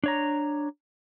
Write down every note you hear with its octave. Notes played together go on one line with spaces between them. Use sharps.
D4 C#5 A#5